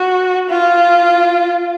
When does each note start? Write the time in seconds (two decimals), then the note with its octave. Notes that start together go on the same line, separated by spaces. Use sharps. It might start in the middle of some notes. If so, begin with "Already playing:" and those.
Already playing: F#4
0.50 F4